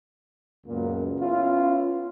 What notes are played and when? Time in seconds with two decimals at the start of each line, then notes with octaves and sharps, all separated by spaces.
0.67 C#2 F#2 A#2 A#3 B3
1.19 B3 C#4 E4 F4